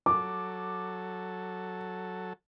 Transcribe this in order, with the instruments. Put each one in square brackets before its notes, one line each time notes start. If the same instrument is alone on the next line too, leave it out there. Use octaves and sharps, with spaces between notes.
[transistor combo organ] F#3 A4 [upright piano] D6